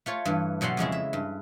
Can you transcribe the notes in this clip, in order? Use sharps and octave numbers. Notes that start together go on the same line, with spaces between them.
A3 F4 C#5
G2 E3
B2 F#3 G3 F#5 C6
F2 C#3 G#3 E4
E5
G2